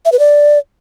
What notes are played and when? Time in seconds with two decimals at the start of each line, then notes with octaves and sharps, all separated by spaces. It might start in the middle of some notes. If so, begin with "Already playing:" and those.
0.05 E5
0.12 B4
0.19 D5